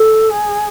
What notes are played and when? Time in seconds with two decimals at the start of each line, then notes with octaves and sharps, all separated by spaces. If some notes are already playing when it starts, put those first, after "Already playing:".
Already playing: A4
0.30 G#4